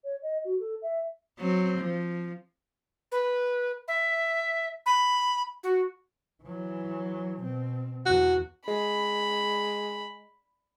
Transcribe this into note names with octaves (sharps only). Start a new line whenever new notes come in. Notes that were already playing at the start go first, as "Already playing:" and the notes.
C#5
D#5
F#4
A4
E5
F#3 C4
F3
B4
E5
B5
F#4
E3 F#3
B2 C4
E2 F#4
G#3 B5